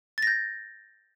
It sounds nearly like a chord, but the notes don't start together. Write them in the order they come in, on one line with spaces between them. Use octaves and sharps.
A6 A#6 G6